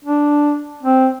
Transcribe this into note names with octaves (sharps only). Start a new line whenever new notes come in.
D4
C4